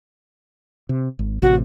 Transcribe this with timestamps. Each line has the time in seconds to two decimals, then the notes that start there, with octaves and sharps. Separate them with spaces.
0.89 C3
1.19 G#1
1.42 A1 C3 F#4